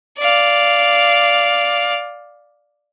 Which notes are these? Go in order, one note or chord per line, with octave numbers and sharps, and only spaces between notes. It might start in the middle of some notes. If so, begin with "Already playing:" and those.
D5 F5